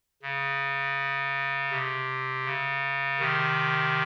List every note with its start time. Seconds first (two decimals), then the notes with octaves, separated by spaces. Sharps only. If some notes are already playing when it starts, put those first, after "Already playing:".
0.23 C#3
1.71 C3
2.46 C#3
3.19 C3 D#3